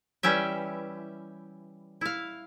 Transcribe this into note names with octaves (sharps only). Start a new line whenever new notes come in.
E3 G3 C#4 G4 E5
E4 F5